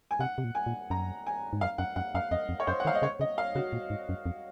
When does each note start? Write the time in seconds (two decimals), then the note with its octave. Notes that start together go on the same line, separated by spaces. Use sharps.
0.11 G#5
0.19 C3 F#5
0.38 C3
0.44 A#2
0.55 G#5
0.66 A#2
0.90 F#2 A#5
1.27 G#5
1.53 G#2
1.61 F#2 F5
1.78 F#2 F#5
1.96 F#2 F#5
2.15 F#2 F5
2.31 F2 D#5
2.49 F2
2.60 C#5
2.67 F#2 C5
2.80 F#5
2.85 D#3 F5
2.95 D#5
3.02 C#3 C#5
3.20 C#3 D#5
3.38 F5
3.55 C#3 F#4
3.73 A#2
3.90 G#2
4.09 F#2
4.26 F2